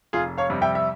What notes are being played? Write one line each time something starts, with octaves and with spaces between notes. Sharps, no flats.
F1 F4 G#4
C#5 F5
F2 C3 G3
E5 G5
E5